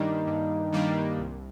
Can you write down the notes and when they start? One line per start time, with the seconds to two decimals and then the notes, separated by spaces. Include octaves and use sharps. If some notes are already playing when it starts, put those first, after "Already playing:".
Already playing: G2 D#3 G3 A#3 D4 D#4
0.27 G2
0.73 D#3 G3 A#3 D4
1.18 C2